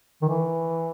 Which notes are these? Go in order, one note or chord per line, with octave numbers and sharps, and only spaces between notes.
D#3
E3